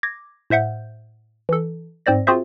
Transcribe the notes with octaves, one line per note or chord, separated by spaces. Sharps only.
D6 G#6 A#6
A2 C5 E5 F#5 G6
E3 A4
G#2 C4 C5 D5 A#6
C4 F4 F#4 G#4 C5 E5